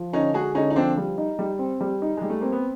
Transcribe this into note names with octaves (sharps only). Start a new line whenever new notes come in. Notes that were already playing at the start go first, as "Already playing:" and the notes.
Already playing: F3
D3 C#4 D#4
G#3 F#4 G#4
D3 C#4 D#4
D#4
F3 C4 D4
G3
D#4
G3
C4
G3
D#4
G3 G#3
A3
A#3 C4
B3